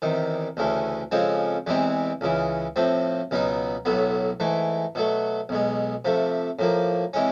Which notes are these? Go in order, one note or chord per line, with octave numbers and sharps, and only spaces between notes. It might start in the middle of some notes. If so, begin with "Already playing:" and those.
E2 C3 D#3
D2 C#3 E3 A3
F2 C#3 F3 G#3 C4
E2 C3 E3 G#3 C4
C#2 C#3 E3
A2 F3 A3 C4
C#2 B2 F#3 B3 D#4
B1 A2 F#3 B3
G#2 E3 A3
B2 F#3 A3
B1 B2 G#3
C3 F3 A3
A2 F3 A#3
C3 E3 G#3 C#4